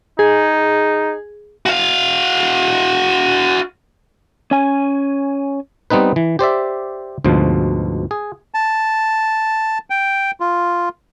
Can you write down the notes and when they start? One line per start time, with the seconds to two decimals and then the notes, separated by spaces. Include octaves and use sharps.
0.19 D#4 G#4
1.66 F#4 F5
4.51 C#4 G#5
5.90 G3 B3 C4 D#4 B4
6.16 E3
6.39 G4 C5 D5 E5
7.25 D2 G#2 B2 F3
8.11 G#4
8.54 A5
9.90 G5
10.40 F4